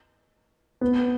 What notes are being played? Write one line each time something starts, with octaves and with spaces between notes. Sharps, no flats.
B3